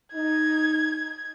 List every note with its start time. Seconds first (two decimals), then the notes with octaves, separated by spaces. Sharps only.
0.14 D#4 G#6